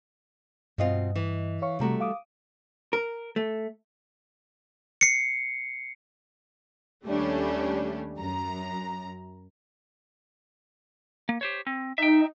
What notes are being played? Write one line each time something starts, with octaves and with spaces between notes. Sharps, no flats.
G2 B2 C4 F4 D#5
E3
C#5 F5 C#6
C3 G3 A3 F#4 A#5
F5 D6 D#6
A#4
A3
C7 C#7
D#2 G3 A3 C#4 D4
F#2 A#5
A#3
G4 C5 C#5
C4
D#4 E5 G5